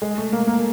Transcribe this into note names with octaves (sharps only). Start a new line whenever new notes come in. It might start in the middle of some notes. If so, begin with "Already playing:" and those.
G#3
A3
A#3
A#3